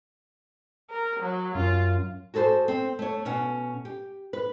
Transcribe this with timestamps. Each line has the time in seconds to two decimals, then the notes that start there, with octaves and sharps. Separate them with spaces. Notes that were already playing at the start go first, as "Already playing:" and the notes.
0.90 A#4
1.20 F#3
1.55 F#2 F4
2.34 F#4 G#4 A4 B4 C5
2.68 C4
2.99 A3 C#5
3.25 B2 C#4 F#5
3.85 G4
4.33 B4